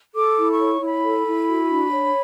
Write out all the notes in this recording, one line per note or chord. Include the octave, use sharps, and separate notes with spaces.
A4 D6
E4
C#6
C#5
E4 B5
A4
E4
F#4
D4
C#5